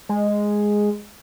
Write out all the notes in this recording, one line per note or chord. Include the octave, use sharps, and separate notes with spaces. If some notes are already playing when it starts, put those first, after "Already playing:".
G#3